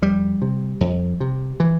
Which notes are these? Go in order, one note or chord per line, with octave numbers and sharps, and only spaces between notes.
F2 G3
C3
F2
C3
E3